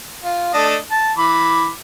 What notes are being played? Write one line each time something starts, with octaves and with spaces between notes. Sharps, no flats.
F4
A3 D4 D#5
A5
E3 B5 D6